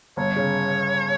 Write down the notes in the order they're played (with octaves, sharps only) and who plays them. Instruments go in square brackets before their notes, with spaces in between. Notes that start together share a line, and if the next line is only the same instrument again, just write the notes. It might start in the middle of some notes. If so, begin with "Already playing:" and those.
[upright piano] G1 [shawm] C#5
[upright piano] C#3